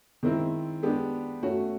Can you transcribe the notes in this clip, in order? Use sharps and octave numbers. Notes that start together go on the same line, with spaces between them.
D#3 G#3 C4 E4
G#3 B3 D4 G4
A3 C#4 F#4